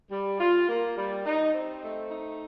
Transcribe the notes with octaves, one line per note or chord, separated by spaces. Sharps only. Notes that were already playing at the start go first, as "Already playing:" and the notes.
G3
F4
A#3
G3
D#4
C4
A3
D#4